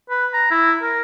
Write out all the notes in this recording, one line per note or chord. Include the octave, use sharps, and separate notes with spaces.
B4
A#5
E4
A#4